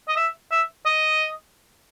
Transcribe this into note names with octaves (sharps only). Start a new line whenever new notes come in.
D#5
E5
E5
D#5